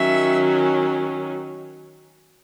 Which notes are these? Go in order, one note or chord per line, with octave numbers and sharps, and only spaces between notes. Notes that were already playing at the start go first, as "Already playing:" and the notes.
Already playing: D#3 F#3 C#4 E5